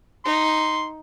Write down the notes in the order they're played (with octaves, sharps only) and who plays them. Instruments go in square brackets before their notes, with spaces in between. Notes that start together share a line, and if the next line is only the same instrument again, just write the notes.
[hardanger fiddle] D#4 [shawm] C6